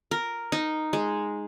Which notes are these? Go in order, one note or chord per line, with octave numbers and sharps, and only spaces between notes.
A#4
D#4
G#3